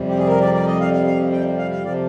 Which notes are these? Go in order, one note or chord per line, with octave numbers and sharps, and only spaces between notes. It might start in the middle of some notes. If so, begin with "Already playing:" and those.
Already playing: F2 C3 G3
G4
G#4
A#4
D5
D5
D#5
F5
F5
F5
G5
F5
F5
C3 F3 D5